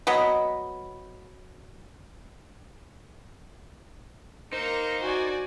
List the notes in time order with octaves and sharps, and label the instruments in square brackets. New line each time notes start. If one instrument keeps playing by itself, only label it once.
[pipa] F#3 B3 D#5 B5
[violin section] A#3 C#7 [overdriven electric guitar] D#4 [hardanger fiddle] A#4 [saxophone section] C5
[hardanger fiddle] F#4 [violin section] D5 G#5